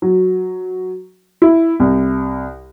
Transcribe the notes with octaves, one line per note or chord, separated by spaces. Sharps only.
F#3
E4
C2